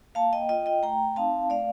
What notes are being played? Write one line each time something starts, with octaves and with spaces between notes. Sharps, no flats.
A#3 F5 A5
D#5 G5
F4 D#5 G5
D#5 G5
A3 G5 A#5
C4 D#4 F5 A5
A3 D5 F5